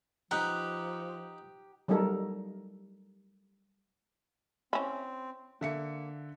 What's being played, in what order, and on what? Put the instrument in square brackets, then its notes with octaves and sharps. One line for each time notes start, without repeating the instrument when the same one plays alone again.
[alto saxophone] F3 [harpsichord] D#4 B4 F#5 [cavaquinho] G4 [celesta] A#5 F#6
[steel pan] F#3 G3 A3 D#4 A4 A#4
[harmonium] C4 [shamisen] C#4 E4
[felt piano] D3 E5 C#7 [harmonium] A#3